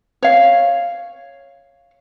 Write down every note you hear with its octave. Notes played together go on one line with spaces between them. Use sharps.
C#5 F5